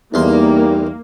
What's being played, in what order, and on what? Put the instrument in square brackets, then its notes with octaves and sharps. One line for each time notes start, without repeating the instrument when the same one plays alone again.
[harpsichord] E2 C6 [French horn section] G3 D#4 [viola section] A#3